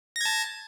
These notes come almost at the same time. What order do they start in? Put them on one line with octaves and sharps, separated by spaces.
A#6 G#6 A5